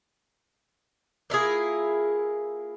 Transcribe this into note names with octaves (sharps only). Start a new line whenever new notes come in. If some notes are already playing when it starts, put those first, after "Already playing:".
A#3 E4 F4 G#4